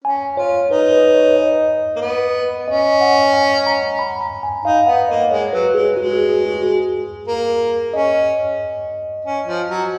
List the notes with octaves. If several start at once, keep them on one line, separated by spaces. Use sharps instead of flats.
C#4 G#5
F4 C#5
D#4 B4
B4
C#5
D#5
A#3
B3
C#4 D#5
F#5
G#5
A#5
B5
A#5
G#5
D#4 F5
B3 F#5
A#3 D#5
G#3 C#5
F#3 B4
G#3 G#4
G#3 F#4
G#4
G#4
F#4
G#4
A#3
C#4 D#5
C#4
F3
F#3